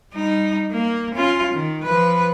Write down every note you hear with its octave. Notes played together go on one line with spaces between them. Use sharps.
G3 D#4
A#3
C#4 F4
D#3
F3 B4